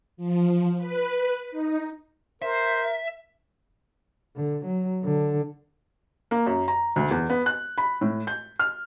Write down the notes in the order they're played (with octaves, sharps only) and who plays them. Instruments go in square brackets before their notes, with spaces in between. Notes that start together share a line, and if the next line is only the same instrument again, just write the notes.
[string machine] F3
B4
D#4
[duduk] A#4 [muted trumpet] C5 [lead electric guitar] E5
[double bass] D3
F#3
D3
[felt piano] A#3
F#2
A#5
D2
E2
B3
F#6
B5
A2
G6
F6